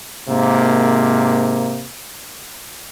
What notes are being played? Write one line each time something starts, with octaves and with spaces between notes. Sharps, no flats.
G#2 C3 A#3